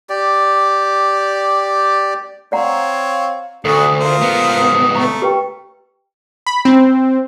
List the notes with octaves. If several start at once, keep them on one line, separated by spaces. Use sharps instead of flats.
G4 D5
C4 C#5 D5 F5 F#5 A#5
D2 D4 F#4 A4 D#6
F4 A#4 C5
C#2 B3
A3 A#5 C#6
G4 B4 G5
B5
C4